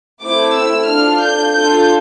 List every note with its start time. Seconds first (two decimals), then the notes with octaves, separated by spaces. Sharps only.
0.23 A3 C4 E4 D6
0.55 E6
0.88 D4 F4 A4 F6
1.22 G6
1.55 D4 F4 A4 G6